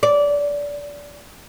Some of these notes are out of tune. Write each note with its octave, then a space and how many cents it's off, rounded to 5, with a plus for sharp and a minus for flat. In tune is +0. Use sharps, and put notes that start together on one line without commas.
D5 -20